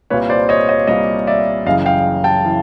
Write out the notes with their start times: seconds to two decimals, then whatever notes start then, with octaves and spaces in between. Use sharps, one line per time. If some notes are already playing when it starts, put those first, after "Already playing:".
0.10 C2 A#2 G3 A#3 B4 C#5
0.29 C5 D5
0.49 C#5 D#5
0.69 C#5 D#5
0.87 C2 A#2 G3 A#3 C#5 D#5
1.27 D5 E5
1.66 F#1 F#2 C#3 E3 D#5 F5
1.86 F5 G5
2.24 G5 A5
2.44 C#3 E3